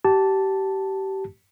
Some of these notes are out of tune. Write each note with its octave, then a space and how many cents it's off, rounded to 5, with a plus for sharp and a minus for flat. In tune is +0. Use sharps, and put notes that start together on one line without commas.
G4 -25 A5 +0